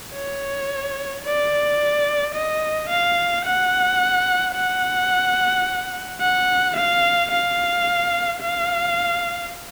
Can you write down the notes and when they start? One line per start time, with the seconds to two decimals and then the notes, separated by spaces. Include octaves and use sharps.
0.14 C#5
1.25 D5
2.35 D#5
2.89 F5
3.46 F#5
4.56 F#5
6.21 F#5
6.76 F5
7.31 F5
8.42 F5